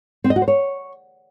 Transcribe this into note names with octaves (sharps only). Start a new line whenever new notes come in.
C4
D#5
F#4
C5
C#5